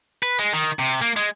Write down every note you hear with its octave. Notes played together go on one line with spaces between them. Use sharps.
B4
G#3
D#3
C3
A#3
G#3